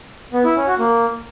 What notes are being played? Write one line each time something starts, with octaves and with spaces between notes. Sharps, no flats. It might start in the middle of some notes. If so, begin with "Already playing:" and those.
B3
E4
C#4
F#4
A#3